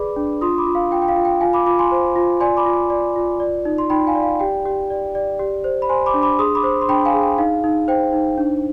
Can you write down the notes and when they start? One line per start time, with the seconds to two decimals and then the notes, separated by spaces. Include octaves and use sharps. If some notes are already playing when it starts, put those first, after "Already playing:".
Already playing: G#4 B4 D5 B5 D6
0.16 D4
0.41 F4 C6 D#6
0.58 B5 D6
0.67 F4
0.75 F5
0.91 F4 G5
1.02 G5
1.08 F5
1.16 F4
1.25 G5
1.41 F4 F5 G#5
1.53 B5 D6
1.66 F4 B5 D6
1.79 G#5 C6
1.92 C5
2.16 F4
2.40 D5 G#5 C6
2.57 B5 D6
2.66 F4
2.90 D5
3.16 F4
3.40 D5
3.65 D#4
3.78 C6
3.90 D#4 G5 B5
4.07 F5 G#5
4.15 D5
4.23 F5
4.40 G4 G5
4.65 G4
4.90 D5
5.15 D5
5.39 G4
5.64 C5
5.82 B5
5.89 C5 G#5 C6
6.06 B5 D6
6.14 D4
6.22 B5 D6
6.39 G#4 C6 D#6
6.55 B5 D6
6.64 C5
6.81 C6
6.88 D4 G5 B5
7.05 F5 G#5
7.14 G#4
7.22 G5
7.38 D#4 F5
7.64 D#4
7.88 C5 G5
8.13 D#4
8.38 D4